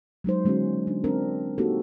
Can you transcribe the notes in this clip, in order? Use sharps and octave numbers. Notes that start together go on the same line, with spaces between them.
F#3 G#3 D#4 C5
D3 G#3 A#3 C#4 F#4
D4
C4 D4 A#4
A#3 C4 D#4 F#4 G4 A4